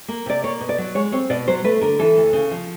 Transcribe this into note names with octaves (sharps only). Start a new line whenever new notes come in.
A#3
C3 D5
A#3 C#5
B2
D5
F#3
G#3 C#5
C4 C#5
B2 D5
F#3 C5
A3 B4
D3 A#4
E3 A4
D2
C#3
F3